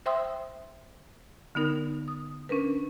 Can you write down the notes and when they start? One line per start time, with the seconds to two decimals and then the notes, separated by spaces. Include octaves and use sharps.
0.06 C5 E5 G5 C6 D#6 E6
1.55 D3 B3 D#4 A#4
2.08 D#6
2.49 C#4 D4 A#4 B4